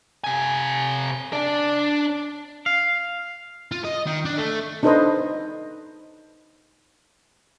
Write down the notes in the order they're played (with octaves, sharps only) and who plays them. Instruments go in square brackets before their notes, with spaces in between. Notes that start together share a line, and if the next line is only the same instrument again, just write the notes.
[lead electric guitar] C3 G#5
D4 D5
[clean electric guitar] F5
[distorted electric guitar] F4
D#5
D#3
D4
A3
[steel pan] D4 D#4 A4 B4 C5 D#5